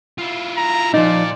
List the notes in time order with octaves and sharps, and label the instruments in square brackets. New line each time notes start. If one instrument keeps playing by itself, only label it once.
[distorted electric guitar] E4 F4
[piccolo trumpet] A#5
[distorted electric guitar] A#2 [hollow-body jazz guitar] F3 D#4 [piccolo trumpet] D5